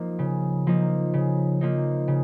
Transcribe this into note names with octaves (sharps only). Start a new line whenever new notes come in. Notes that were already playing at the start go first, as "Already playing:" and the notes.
Already playing: F3 A#3 D#4
C#3
F3 A#3 D#4
C#3
F3 A#3 D#4
C#3